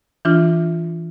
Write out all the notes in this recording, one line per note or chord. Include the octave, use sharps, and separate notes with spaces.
E3 D4 F4